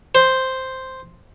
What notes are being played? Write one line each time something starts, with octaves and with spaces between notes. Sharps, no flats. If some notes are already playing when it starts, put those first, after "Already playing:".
C5